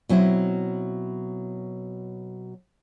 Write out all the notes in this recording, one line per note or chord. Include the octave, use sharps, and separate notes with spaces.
B2 F#3 C4 E4